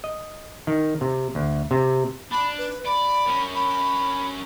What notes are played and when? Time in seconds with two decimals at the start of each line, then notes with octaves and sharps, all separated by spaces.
0.04 D#5
0.67 D#3
1.01 C3
1.35 D2
1.71 C3
2.31 D4 B5
2.58 B4
2.85 D5 B5
3.27 C#4 A#4
3.55 B5